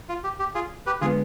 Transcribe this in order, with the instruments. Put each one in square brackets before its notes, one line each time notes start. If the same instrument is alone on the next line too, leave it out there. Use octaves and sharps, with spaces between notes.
[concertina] F4
G4
G4
F4 G#4
G4 B4
[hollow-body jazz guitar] D3 G#3 B3 [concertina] F4 G#4